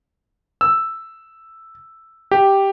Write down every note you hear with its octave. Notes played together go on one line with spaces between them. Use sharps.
E6
G4